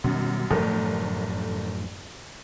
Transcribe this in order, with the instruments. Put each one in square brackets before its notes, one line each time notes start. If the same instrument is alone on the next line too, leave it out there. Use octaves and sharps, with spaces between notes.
[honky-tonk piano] F#2 [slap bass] B2 D#3 G3
[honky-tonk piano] G1 A3 A#4 [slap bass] F#2 A2 F3